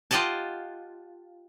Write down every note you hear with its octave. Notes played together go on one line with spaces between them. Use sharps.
F4 G4 D#5 F#5 A5